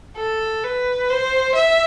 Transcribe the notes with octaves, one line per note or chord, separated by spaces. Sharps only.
A4
B4
C5
E5